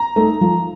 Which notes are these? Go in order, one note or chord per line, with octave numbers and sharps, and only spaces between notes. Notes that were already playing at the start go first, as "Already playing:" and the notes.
Already playing: A#5
A3 D#4
F3